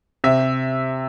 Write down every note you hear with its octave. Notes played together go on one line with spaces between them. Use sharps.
C3 E5